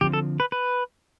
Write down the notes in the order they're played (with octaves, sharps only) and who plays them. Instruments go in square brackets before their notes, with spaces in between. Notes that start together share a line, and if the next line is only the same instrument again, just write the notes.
[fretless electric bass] D3 F3 C4 [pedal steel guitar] G4
[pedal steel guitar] A4
B4
B4